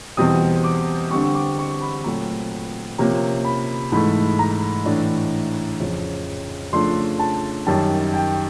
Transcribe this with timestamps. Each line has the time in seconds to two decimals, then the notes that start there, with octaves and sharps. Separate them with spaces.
0.17 E2 B2 G3 C4 D#6
0.64 D6
1.11 D3 G3 C4 C#6
1.35 D6
1.59 C#6
1.81 B5
2.04 A#2 F#3 A3 C4 A#5
2.98 C3 F3 A#3 C#4 A#5
3.45 B5
3.92 G#2 E3 A3 B5
4.39 A#5
4.85 A2 E3 A3 D4
5.80 F2 C#3 F3
6.73 C#3 F3 A3 D4 C6
7.19 A5
7.67 F#2 D#3 G3 A5
8.14 G5